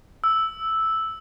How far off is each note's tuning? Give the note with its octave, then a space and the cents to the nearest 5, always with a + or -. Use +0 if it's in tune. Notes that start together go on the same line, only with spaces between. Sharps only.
E6 -5